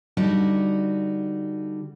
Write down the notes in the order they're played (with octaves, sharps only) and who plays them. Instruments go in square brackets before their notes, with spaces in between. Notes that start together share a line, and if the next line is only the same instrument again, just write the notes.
[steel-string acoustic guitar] D3 G3 D#4 F#4